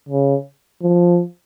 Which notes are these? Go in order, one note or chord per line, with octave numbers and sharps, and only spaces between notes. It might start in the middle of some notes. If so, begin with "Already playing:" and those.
C#3
F3